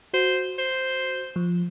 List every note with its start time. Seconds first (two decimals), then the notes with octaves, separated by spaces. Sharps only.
0.13 F#4 C5
0.58 C5
1.36 F3